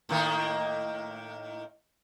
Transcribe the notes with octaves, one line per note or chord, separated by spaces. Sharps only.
A2 D#3 A#3